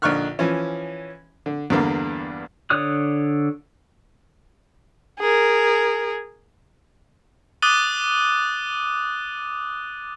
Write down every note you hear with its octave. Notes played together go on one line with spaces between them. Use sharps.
A#1 D3 D#4 C#6 F6 F#6
E3 F3 C#4
D3
E2 G2 D3 A#3
D3 C#5 D5 D#6 F#6
G#4 A#4
D6 D#6 F#6 A6 D#7 G7